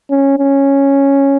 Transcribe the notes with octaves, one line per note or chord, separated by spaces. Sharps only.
C#4
C#4